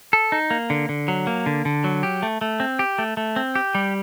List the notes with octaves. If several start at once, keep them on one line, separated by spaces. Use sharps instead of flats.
A4
D#4
A#3
D3
D3
F#3
A#3
D3
D3
F#3
G4
A3
A3
C4
G4
A3
A3
C4
G4
G3